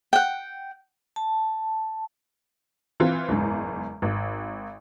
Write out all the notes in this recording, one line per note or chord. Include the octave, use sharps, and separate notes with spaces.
F#5 G5
A5
E3 C4 F4
F#1 E2 G#2
G#1